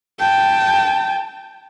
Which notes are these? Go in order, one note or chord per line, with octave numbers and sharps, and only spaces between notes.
G5 A5